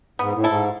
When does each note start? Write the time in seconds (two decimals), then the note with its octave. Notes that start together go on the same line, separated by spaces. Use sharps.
0.19 G#2 B3
0.33 A2
0.44 G#2 E4 A4